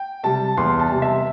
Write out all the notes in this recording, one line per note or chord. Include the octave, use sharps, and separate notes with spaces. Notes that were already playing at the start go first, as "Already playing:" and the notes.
Already playing: G5
C3 G3 A5
E2 C6
A5
C3 G3
E5